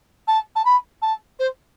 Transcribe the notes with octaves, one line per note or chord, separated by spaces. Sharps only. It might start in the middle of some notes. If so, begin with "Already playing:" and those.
A5
A5
B5
A5
C5